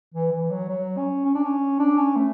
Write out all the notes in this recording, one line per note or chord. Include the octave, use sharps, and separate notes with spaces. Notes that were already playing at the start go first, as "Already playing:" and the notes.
E3
E3
F#3
F#3
C#4
C#4
D4
C#4
D4
C#4
A3